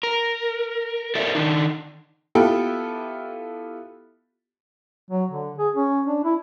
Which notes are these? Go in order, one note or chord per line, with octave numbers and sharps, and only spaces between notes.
A#4
A4 A#4 C5 D5 E5
D#3 F3 D4 D#4
B3 E4 F4 G4 A4
F#3
D3
G#4
C#4
D4
E4